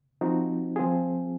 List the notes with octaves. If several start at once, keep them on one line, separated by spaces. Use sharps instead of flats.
F3 C4 D#4 F#4
F3 C4 F4 G#4